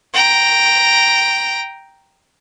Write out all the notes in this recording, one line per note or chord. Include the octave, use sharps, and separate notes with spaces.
G5 A#5